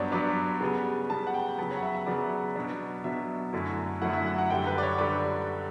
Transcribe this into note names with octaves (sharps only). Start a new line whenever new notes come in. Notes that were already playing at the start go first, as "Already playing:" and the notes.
Already playing: G2 F#3 B3 D4 C#5 D5
G2 F#3 B3 D4 D5
C#3 G3 B3
C#3 G3 B3 A5
F#5
G5
C#3 F#3 B3 A5
C#5
F#5
E5
E5
C#3 F#3 B3 D5
B2 F#3 B3 D4
B2 F#3 B3 D4 E5
F#2 D3 F#3 A3 E4
F#2 D3 F#3 A3 E4 F#5
E5
F#5
F#5
F#2 D3 G3 G5
B4
D5
C#5
D3 G3 D5